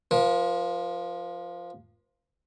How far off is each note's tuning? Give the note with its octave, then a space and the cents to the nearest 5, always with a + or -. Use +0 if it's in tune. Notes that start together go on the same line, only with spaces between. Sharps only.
F3 +0 A#4 +45